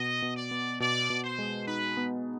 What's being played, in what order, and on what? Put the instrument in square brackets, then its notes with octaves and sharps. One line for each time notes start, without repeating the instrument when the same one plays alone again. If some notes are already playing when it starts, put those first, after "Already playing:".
Already playing: [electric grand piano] B2 [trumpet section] D#5
[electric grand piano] B2
[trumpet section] D5
[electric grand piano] B3
[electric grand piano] B2 [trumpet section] D5
[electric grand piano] B2
[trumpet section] C5
[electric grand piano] G#3
[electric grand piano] D#4 [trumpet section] B4
[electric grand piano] B3